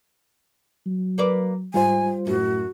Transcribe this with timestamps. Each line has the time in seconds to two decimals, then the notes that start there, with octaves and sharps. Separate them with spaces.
0.86 F#3
1.18 A#3 B4 D5
1.74 G#2 G3 F4 C5 G#5
2.27 F#2 A2 F#4